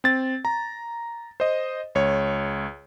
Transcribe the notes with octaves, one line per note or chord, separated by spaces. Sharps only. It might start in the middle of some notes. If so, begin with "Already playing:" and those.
C4 A6
A#5
C5 D#5
C#2 C#5